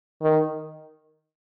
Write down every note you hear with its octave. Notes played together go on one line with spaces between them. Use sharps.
D#3